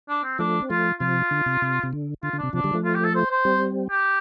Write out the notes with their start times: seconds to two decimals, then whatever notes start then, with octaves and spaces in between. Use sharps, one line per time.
0.09 D4
0.23 C4
0.39 F3 A3 D4
0.62 C4
0.70 F3 A3 F4
1.00 C3 F3 F4
1.31 D3
1.46 C3
1.62 C3
1.83 C3
1.93 D3
2.23 D3 F4
2.33 D3
2.38 C3 D4
2.53 C3 F3 D4
2.64 D3 G3
2.73 F3 A3
2.85 F4
2.94 G4
3.05 A4
3.15 C5
3.31 C5
3.45 G3 C4
3.91 G4